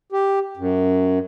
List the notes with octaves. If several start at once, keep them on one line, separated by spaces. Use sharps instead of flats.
G4
F#2